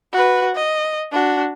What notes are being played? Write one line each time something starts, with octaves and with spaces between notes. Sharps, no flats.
F#4 B4
D#5
D4 F#4